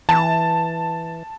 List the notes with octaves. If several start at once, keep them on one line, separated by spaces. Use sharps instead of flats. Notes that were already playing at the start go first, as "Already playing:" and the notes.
E3 A5